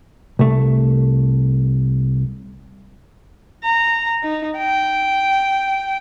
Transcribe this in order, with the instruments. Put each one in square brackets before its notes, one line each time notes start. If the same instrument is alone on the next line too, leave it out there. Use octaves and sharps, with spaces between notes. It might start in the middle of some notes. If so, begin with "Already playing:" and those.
[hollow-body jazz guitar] C2 A3
[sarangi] A#5
D#4
G5